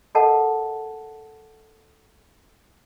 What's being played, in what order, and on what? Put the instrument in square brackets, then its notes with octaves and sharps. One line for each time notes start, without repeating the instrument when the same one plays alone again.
[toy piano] A4 A#4 D#5 F#5 A5